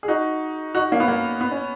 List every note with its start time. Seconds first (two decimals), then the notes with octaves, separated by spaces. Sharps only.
0.03 G#4
0.08 D#4 F#4
0.75 D#4 F#4
0.91 A#3 C#4
1.00 B3
1.08 A#3
1.41 B3
1.51 C#4